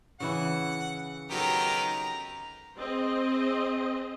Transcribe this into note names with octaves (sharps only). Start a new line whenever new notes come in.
C#3 E3 E4 F#5
D#3 F#3 B3 G4 A4 A#5
C4 G#4 C5 D#5